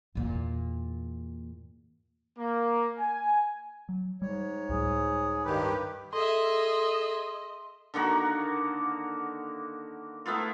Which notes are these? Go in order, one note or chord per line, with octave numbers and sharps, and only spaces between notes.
E2 A#2
A#3
G#5
F#3
G#2 G3 C#5
C#2 A2 G3 G#4
G2 D#3 G4 B4
G#4 A4 D#5 E5 C6
D3 D#3 A#3 F#4
A3 B3 E4 F4